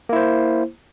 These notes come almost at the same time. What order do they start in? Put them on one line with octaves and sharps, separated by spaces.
A#3 E4 C5